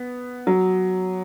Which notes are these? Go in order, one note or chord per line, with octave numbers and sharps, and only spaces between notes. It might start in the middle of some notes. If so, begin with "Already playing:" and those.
Already playing: B3
F#3